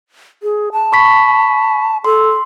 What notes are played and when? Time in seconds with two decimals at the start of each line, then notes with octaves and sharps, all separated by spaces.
0.43 G#4
0.72 A5
0.92 B5 C#6 B6
2.04 A4 C6